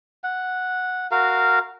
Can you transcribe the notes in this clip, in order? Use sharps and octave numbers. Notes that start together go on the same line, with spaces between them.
F#5
F#4 A#4 F5